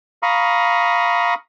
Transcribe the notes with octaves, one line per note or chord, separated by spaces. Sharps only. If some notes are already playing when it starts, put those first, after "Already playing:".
F5 A#5 B5 C#6 D#6